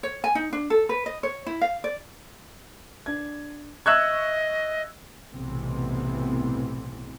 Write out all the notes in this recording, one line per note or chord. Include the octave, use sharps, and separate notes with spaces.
C#5
G#5
D#4
D4
A4
B4
D#5
C#5
E4
F5
D5
D4 G#6
D#5 E5 C#6 E6 F#6 G#6
B1 A2 C3 E3 B3 C4